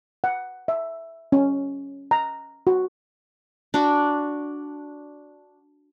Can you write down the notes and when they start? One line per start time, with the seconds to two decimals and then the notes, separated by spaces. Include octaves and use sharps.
0.24 F#5
0.68 E5
1.32 C#4
2.11 A#5
2.67 F#4
3.74 D4 F#4